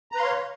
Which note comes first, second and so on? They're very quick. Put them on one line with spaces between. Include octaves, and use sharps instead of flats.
A#5 B4 C6 F5 C#5